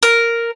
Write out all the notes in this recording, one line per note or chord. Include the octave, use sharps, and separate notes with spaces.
A#4